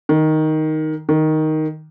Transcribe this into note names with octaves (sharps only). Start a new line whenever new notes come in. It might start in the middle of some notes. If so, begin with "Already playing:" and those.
D#3
D#3